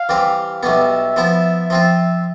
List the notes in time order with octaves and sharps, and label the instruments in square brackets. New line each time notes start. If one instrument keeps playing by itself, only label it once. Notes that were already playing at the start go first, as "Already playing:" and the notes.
Already playing: [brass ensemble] F5
[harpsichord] E3 G3 C4 G4
[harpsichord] B1 B2 G3 B3 [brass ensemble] E5
[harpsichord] F3 B3 E4
F3 C4 F4